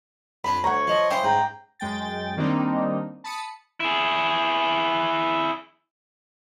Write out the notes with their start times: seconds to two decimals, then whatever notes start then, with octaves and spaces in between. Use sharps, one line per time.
0.44 F2 D4 B5
0.64 D2 C#5 F#5 A#5
0.87 F3 D#5
1.11 C#4 E4 G4 C5 D#5 F5
1.24 G#2 G5 A#5
1.79 F#2 G#3 G5 A6
2.37 D#3 G3 A#3 C4 D4 D#4
3.24 A5 B5 D#6 C#7
3.80 E4 G#4